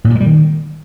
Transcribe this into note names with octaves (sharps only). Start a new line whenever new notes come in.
A2
A#2
G#3
G3
D#3